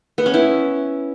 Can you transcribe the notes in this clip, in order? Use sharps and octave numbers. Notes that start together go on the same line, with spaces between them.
B3
C#4
E4